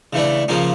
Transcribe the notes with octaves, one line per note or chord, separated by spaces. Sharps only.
C#3 E3 A3 D4
C#3 F3 A#3 C#4